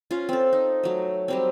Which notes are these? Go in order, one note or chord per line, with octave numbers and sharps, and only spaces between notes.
C#4 F4
C4 A4
D#4
F#3 A3
F#3 G3 C4